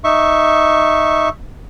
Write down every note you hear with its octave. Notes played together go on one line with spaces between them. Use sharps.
D#4 E5 C#6